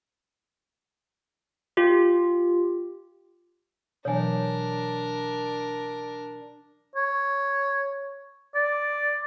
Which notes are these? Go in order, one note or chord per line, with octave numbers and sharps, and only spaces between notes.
F4 G4
B2 E3 F#3 D4 A#4 C#5 G#5
C#5
D5